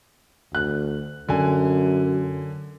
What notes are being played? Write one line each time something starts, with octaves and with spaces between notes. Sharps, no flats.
D2 F#6
F#2 D3 G#5